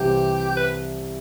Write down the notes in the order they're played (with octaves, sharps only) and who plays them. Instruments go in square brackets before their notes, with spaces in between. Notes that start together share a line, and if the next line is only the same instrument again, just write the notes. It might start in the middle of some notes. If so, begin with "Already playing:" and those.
Already playing: [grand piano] C2 C3 E3 [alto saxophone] G4
[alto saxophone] B4